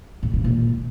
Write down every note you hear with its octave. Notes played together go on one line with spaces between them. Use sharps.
A2
C#3
A#2